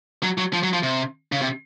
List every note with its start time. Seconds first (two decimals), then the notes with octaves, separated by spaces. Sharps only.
0.23 F#3
0.38 F#3
0.53 F3
0.63 F#3
0.73 F3
0.83 C3
1.32 C#3
1.41 C3